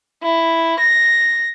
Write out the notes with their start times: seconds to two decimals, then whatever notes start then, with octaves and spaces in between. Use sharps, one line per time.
0.23 E4
0.79 A#6